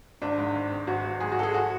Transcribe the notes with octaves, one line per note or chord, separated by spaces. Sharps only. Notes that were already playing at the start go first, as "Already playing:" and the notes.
G#1 D4
G#2
G#1
G#1
G#1 F#4
G#1
G#2 G#4
F#4
G#1 A4
G#4
F#4